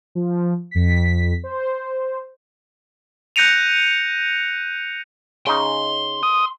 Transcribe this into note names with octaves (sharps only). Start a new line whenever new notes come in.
F3
F2 B6
C5
F#6 G6 A#6 C#7 D#7 F7
C#3 D#4 C6
D#6